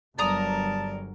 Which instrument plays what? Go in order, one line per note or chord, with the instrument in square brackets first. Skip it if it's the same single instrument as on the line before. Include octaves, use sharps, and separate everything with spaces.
[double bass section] G1 [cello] F#3 A#4 [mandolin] D5 A#5 D#6 [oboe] A5